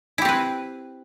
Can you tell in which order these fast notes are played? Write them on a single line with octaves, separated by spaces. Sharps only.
E4 G4 C4 B4